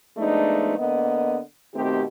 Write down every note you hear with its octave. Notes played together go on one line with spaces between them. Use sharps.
F3 G#3 A3 B3 D4 D#4
D3 A#3 B3 D#5
B2 D#3 A3 C4 G4